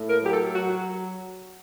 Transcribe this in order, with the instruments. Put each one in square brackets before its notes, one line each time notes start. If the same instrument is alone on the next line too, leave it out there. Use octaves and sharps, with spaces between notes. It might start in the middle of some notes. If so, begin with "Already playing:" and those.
Already playing: [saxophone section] A2
A#4
F#3
G4
A4
F#3 F#4